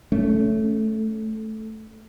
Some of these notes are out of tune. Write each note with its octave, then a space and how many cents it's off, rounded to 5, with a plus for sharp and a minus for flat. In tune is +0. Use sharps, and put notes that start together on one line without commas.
A3 -5 C#4 +0